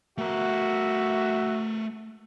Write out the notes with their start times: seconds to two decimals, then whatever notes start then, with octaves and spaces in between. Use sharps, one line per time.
0.18 A3 F#4 A#4 E5